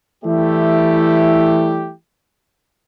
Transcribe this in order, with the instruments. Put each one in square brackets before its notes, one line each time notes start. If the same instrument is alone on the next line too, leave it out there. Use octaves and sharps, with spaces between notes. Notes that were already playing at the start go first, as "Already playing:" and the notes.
[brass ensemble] E3 G3 A3 E4 G4